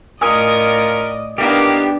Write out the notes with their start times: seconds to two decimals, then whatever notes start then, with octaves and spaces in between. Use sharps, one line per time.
0.21 A2 C#4 F4 A#4 D5 D#5 G#5 D#6
1.38 D#3 E3 A#3 B3 D4 G4